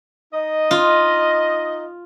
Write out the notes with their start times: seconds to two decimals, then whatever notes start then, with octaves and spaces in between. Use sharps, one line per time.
0.34 D#4 D#5
0.71 F4